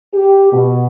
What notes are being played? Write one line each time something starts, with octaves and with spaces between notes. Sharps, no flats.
G4
B2